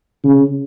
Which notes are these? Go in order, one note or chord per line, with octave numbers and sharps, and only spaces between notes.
C#3